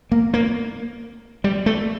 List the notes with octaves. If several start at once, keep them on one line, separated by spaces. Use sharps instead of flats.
A#3
A#3
G3
A3